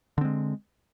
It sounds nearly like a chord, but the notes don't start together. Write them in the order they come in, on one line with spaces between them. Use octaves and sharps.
D3 C4 G#3